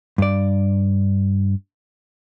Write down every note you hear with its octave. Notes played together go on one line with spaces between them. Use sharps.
G2 D5